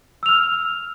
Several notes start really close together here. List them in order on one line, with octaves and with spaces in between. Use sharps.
E6 F7 F6